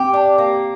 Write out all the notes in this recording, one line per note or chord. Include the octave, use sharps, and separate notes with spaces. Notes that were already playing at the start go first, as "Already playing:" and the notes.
Already playing: C4 G4
D4
A#3